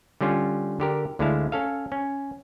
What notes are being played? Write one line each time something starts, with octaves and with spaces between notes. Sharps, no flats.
D3 G3 C#4 F4
D3 G4 A#4
D2 D3 G#3 E4 F5 A5
C#4 A4 F5
C#4